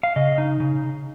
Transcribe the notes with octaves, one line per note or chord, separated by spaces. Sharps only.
F5
C#3 D#5
D#4
C#3